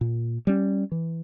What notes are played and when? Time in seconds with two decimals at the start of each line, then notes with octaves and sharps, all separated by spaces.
0.01 A#2
0.47 G3 C#4
0.92 E3